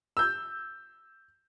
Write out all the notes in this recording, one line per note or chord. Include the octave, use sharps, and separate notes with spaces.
E6 G6